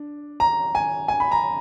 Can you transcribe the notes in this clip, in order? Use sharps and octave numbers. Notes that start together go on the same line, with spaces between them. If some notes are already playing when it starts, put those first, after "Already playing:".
Already playing: D4
A#5
G#5
G#5
B5
A#5